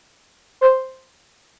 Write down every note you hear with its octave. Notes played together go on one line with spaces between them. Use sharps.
C5